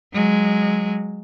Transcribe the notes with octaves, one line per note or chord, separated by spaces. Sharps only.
F#3 G#3